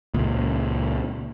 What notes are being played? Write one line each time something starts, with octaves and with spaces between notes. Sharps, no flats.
C#2 A#2